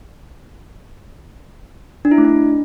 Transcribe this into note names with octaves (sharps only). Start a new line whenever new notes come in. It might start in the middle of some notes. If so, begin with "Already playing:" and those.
D4
E4
A3
D4